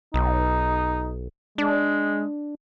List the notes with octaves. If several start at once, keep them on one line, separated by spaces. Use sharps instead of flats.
B1 D#4
G#3 D4